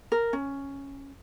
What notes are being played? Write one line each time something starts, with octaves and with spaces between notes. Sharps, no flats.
A#4
C#4